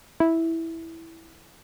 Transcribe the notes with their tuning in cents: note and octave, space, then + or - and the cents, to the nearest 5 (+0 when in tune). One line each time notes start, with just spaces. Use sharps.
E4 -5